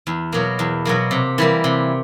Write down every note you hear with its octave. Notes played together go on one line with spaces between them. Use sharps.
E2
B2 F#3 A#3
E2
B2 F#3 A#3
C3
E3 G3 A#3
C3